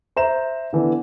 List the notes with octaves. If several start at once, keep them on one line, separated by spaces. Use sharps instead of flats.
C5 E5 A#5 E7
D3 E3 B3 D4